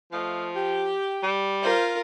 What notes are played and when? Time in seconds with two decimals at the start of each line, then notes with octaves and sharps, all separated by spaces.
0.12 F3 A3 D#5 F5
0.55 G4
1.23 G3
1.63 F4 A#4 C5